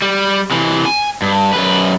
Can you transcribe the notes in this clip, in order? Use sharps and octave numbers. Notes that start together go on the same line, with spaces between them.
G3
C3 E3
G#5
G2
F#2 B4